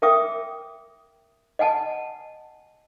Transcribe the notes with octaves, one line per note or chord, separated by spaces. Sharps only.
A#4 E5 G5 D6 D#6
D#5 F#5 G#5 A5